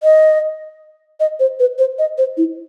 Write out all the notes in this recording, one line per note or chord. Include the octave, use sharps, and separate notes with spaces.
D#5
D#5
C5
B4
C5
D#5
C5
E4